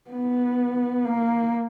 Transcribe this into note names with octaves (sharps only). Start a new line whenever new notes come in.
B3
A#3